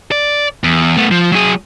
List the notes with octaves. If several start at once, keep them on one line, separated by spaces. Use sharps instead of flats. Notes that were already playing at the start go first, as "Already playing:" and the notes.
D5
E2
A3 B3
F3
F#3 G#4